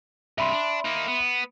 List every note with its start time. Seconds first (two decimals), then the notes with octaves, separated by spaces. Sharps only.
0.38 G2 C3 E5 B5 C6
0.52 D4
0.85 A#3 D#4
1.08 B3